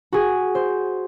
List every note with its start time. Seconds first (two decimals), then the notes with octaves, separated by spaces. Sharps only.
0.12 F#4 G#4
0.55 C5